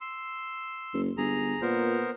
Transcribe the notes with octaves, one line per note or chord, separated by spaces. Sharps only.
C6 E6
F#1
G1 G#4 A#5
A#2 B3 A#4 C5